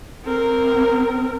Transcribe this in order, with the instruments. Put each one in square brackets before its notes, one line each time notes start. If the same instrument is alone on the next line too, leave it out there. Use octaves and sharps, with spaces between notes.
[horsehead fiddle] C4 A#4